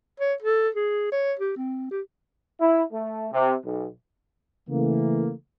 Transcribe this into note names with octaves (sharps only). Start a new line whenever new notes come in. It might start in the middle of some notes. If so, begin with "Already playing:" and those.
C#5
A4
G#4
C#5
G4
C4
G4
E4
A3
C3
B1
C#3 E3 A3 A#3